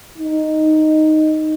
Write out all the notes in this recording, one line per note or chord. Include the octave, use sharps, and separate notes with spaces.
D#4